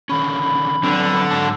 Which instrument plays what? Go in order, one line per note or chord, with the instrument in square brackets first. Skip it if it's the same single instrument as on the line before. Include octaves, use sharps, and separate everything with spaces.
[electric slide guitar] D3 D#3 C#4 [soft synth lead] B5
[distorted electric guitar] D3 [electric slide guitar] F#3 B3 C4
[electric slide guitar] G#2 F#3 A5